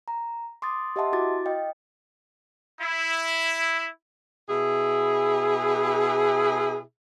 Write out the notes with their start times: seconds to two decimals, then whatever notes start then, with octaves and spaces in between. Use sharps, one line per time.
0.08 A#5
0.62 C6 D6 D#6 A6
0.96 G4 D#5 E5 F#5 A5 C6
1.13 E4 F#4 D6 A6
1.46 D#5 F5 G5
2.81 E4
4.48 B2 E4 G#4